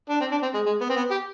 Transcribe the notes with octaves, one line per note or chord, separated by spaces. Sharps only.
D4
C4
D4
C4
G#3
G#3
B3
C4
B3
G4